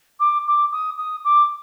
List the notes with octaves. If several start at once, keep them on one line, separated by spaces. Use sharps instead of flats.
D6
D6
D#6
D#6
D6